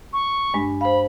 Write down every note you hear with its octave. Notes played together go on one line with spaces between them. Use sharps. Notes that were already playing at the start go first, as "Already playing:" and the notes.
C#6
G2 G#3 D4
C5 F5 B5